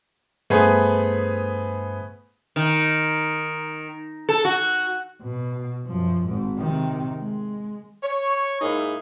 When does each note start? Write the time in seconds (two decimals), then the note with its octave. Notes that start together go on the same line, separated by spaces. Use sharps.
0.50 G2 A3 B3 G#4 C5
2.56 D#3
4.29 A4
4.45 F#4
5.22 B2
5.86 F#2 F3
6.27 G#1 G#2
6.58 C3 D#3
7.17 G#3
8.04 C#5
8.61 G#2 A#3 D#4 E4 G#4